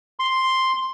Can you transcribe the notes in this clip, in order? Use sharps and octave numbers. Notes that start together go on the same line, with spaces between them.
C6